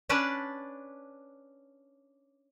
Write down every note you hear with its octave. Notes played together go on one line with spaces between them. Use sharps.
C#4 D4 B4 D5 A5